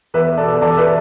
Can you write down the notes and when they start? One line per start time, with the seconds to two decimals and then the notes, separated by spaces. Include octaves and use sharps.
0.14 E2 B4 E5
0.37 B2 A4 D5
0.61 E2 A4 D5
0.77 B4 E5